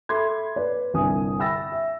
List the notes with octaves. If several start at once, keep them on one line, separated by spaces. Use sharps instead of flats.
A4 E5 B5 C6 D6 G#6
B4 D5
G1 C2 G#5 D#6
E5 G5 B5 E6 A6 A#6
E5